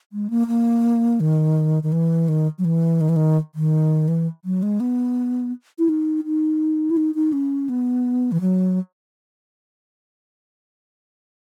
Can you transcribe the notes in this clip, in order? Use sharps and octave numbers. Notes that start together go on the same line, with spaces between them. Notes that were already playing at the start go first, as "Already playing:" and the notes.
G#3
A#3
A#3
D#3
D#3
E3
D#3
F#3
E3
D#3
E3
D#3
D#3
E3
F#3
G#3
B3
E4
D#4
D#4
E4
D#4
D#4
C#4
B3
E3
F#3